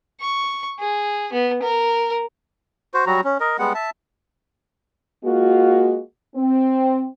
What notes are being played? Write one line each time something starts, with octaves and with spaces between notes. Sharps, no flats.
C#6
G#4
B3
A#4
F#4 C5
F#3 G3 F#4 A#5
C#4
A#4 D#5
G3 G#3 B3 F#5
E5 A5
G#3 A#3 F4 F#4
C4